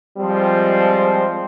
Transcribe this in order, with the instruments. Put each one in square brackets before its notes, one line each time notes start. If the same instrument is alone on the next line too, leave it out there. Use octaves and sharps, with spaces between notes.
[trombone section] F3 G3 G#3 C4